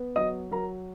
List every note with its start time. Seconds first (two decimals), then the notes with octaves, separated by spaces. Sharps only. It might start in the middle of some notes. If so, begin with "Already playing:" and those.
Already playing: B3
0.16 F#3 D#5 D#6
0.51 F#3 A#4 A#5